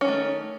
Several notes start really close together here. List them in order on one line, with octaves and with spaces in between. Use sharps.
C#4 D#3 A3